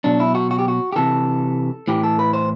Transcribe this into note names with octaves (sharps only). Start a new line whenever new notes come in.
B2 F#3 D4
E4
F#4
F#4
G4
F#4
G4
C3 E3 A4
A2 E3 G4
A4
B4
C5